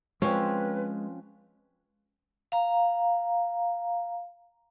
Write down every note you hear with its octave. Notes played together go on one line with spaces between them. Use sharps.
F3 G#3 C4 C#4 B4
F5 A#5